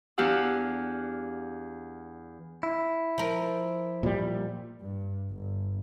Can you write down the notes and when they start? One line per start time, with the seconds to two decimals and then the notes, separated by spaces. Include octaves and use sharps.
0.18 E2 D4 G4 F5 F#5 E6
2.63 E4
3.18 F3 A#4
4.03 A#2 F3 G3
4.81 G2
5.32 G1